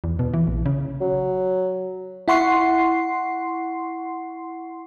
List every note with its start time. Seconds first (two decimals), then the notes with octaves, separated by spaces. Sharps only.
0.04 E2
0.19 B2
0.34 E3
0.47 A#1
0.66 C#3
1.01 F#3
2.28 E4 F#5 C6 C#6 C7